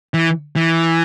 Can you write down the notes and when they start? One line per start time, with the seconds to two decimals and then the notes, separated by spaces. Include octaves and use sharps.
0.14 E3
0.56 E3